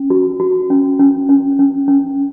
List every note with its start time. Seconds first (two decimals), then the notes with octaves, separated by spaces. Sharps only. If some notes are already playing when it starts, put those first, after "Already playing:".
Already playing: C#4
0.10 F#4
0.40 F#4
0.70 C#4
1.00 C#4
1.29 C#4
1.59 C#4
1.88 C#4